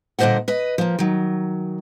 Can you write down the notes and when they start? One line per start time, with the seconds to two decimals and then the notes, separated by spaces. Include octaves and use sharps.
0.19 G2 A#2 D3 C5 D#5 F#5
0.48 B4 D#5
0.78 F3 A#3
0.99 D#3 F#3